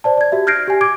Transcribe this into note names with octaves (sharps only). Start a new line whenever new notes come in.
C5 D5 A5
D5 G#6
F#4 G4 E5
F6 G6 G#6 A#6 C7 D7
G4 G#5
D6 G#6 D7